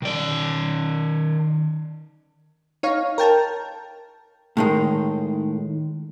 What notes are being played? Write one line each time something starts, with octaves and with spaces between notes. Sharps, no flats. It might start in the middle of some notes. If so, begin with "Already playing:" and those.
D#3 D5
D#4 C#5 F5
A#4 G5 A5
A2 D#3 G#3